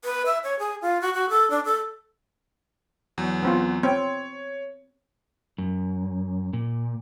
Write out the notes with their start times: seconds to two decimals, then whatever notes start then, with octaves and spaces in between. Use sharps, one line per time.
0.04 B4
0.26 E5
0.44 C#5
0.59 G#4
0.82 F4
1.01 F#4
1.14 F#4
1.29 A4
1.50 D4
1.65 A4
3.18 E2 F#3
3.43 B3 C4 F4
3.83 C4 C#5 G5
5.58 F#2
6.53 A#2